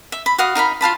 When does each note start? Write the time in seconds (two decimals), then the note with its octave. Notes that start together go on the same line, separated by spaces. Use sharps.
0.12 E5
0.26 B5
0.38 F#4 F5 D#6
0.55 D#4 A#4 F5 B5
0.81 F4 F5 A5 B5